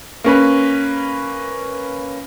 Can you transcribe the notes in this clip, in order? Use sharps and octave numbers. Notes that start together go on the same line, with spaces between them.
A#3 C#4 B4